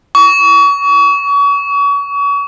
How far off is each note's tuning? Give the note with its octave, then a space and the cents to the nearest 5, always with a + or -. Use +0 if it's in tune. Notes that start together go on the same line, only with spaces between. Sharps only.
C#6 +35